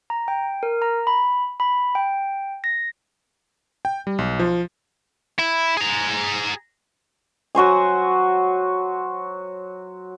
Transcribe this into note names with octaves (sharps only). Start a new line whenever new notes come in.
A#5
G5
A#4
A#5
B5
B5
G5
A#6
G5
G3
B1
F3
E4
G#4 A#5
F#3 F#4 C5 G#5